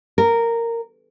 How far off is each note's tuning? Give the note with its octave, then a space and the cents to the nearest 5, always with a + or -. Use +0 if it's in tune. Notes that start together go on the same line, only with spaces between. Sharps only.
A#4 -10